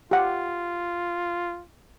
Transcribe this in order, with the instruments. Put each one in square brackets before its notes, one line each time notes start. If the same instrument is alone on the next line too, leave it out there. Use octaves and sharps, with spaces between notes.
[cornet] F4 [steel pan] G4 F#5